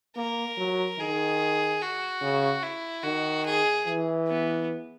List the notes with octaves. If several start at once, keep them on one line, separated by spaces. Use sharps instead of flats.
A#3 A#4
F#3
D#3 G#4
F#4
C#3
E4
D#3 F#4
G#4
E3
B3